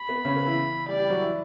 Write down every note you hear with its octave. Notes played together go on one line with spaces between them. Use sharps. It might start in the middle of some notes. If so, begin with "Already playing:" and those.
Already playing: B5
B3
C#3 C#4
B3
E3 E4
G3 G4 D5
G3 G4
F#3 F#4
E3 E4